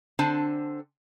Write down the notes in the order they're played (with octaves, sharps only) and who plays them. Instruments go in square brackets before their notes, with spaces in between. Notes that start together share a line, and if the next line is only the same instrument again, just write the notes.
[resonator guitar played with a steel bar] D3 C4 D4 C5 G#5 A5